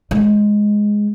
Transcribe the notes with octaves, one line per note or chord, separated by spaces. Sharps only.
G#3